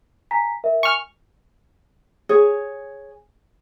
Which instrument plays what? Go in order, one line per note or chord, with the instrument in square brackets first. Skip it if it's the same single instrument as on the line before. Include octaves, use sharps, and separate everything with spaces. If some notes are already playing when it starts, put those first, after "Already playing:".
[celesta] G#5 A#5 B6
A#4 E5
[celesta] G#5 [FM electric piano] C#6 F6
[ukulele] G#4 C#5